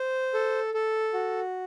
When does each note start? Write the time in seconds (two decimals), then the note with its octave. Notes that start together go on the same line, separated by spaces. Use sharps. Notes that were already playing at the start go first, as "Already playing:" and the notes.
Already playing: C5
0.34 A4
0.74 A4
1.14 F#4